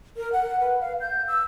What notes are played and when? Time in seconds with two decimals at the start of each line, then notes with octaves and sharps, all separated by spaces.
0.16 A#4
0.32 F#5
0.60 B4
0.80 F5
1.01 G6
1.28 E6